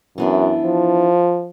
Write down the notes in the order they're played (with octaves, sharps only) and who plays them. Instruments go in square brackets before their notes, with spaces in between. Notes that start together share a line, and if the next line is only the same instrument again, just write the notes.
[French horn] F#2 [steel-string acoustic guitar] E3 B3 D4
[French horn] F3